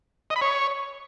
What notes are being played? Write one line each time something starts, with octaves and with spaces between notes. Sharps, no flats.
D#5
B5
C#5